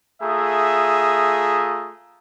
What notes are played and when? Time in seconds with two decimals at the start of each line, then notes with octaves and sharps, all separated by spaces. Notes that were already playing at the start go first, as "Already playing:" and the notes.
0.21 A3 F4 G#4 E5 A#5 D#6